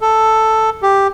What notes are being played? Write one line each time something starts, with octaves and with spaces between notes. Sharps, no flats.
A4
G4